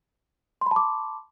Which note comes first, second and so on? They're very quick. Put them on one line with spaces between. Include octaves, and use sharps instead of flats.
C6 B5 A5 D6